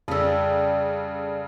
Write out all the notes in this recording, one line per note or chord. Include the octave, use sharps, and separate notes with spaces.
F2 C#3 G3 D4 A4 E6